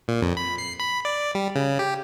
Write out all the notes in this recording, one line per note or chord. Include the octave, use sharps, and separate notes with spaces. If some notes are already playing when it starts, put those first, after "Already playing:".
A#2
F2
B5
C7
B5
D5
G3
C#3
G4